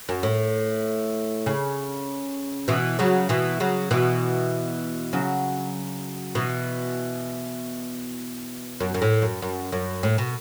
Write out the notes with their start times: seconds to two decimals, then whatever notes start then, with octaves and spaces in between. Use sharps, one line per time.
0.09 F#2
0.23 A2
1.46 C#3
2.68 B2 E3
2.99 C#3 F#3
3.29 B2 E3
3.60 C#3 F#3
3.91 B2 E3
5.13 C#3 F#3
6.35 B2 E3
8.80 F#2
8.94 F#2
9.02 A2
9.22 F#2
9.42 F#2
9.72 F#2
10.03 A2
10.18 B2